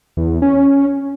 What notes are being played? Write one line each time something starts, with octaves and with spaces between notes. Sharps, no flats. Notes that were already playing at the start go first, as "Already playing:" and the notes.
E2
C#4